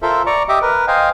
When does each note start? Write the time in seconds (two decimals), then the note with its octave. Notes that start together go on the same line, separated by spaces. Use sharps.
0.02 F4 A4 A#4 C5 E5
0.26 D5 A#5 C#6
0.49 G4 D#5 E5 D6
0.62 A#4 B4
0.88 C5 D#5 F5 G5 G#5